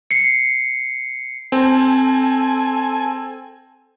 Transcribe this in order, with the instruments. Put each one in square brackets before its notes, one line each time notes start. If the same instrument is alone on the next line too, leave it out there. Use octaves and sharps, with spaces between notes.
[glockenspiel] C7 C#7
[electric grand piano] C4 [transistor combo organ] A4 G#5